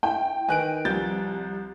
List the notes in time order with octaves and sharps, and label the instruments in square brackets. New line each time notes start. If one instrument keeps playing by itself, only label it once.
[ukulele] E4 [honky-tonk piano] G5
[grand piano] D#3 F#6 D7 [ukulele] B4 G#5
[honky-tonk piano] C2 [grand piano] F3 G6 A6